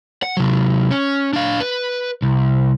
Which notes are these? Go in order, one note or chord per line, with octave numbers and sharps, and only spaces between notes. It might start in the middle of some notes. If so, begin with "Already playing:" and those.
F#5
C3 F#3
C#4
D4 F5
B4
C2